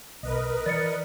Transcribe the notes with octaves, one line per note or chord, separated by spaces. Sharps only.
B1 A#4 B4 D#5
E3 D5 A6 C#7